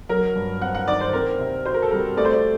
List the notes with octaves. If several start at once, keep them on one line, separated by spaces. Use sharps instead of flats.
F#3 A#4
G2
C4 F#5
F#5
D#3 D5
C5
C4 A#4
C3
F#4 C5
A#4
A4
G3 A#4
A3 D5
C5
D5